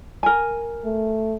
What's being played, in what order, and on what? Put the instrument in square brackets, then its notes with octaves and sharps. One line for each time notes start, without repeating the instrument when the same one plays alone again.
[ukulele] A#4 G#5
[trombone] A3